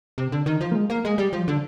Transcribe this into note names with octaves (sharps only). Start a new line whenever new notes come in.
C3
D3
D#3
F3
A#3
G#3
A#3
G#3
G3
F3
D3